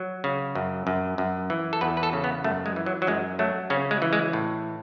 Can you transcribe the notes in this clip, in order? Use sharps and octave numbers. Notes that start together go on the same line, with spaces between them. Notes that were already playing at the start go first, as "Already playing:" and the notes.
Already playing: F#3
C#3
F#2
F#2
F#2
E3
A4
E2 B4
B4
A4
C#3
B3
F#2 A3
G#3
E3
F#3
F#3
F#2 G#3
F#3 A3
C#3 C#4
G#3
E3
G#3
A2